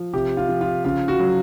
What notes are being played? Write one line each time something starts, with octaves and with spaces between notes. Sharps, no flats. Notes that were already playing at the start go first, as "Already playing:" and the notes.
Already playing: F3
C3 G4
F4
F3
F4
C#3 F4
F#4
F#3